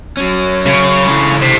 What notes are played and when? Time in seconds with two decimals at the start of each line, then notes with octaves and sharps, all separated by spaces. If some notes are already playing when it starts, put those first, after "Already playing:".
0.17 F#3 C#4
0.66 C#3
1.06 D3 E3 A3
1.42 C3